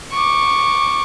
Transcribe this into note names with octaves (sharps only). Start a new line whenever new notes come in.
C#6 D6